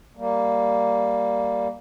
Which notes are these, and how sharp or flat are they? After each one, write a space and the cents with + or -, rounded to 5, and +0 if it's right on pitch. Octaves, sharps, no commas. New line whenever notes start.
G3 +0 A#3 +0